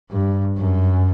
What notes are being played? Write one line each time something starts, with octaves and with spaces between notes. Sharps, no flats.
G2
F#2